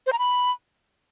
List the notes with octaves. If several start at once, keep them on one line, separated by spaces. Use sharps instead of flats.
C5
A#5
B5